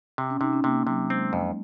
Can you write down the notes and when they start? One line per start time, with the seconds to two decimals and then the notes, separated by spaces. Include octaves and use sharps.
0.18 C3
0.30 C#4
0.40 C3 D#4
0.53 C#4
0.64 C3 A#3
0.87 C3 F#3
1.10 G#3 C4
1.33 F2